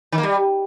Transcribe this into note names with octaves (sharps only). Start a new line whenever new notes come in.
D#3
A#3
G3